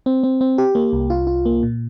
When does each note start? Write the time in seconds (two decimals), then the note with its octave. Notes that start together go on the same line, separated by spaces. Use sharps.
0.06 C4
0.23 C4
0.41 C4
0.58 G4
0.75 A#3
0.93 C2
1.10 F4
1.27 F4
1.46 A#3
1.63 A#2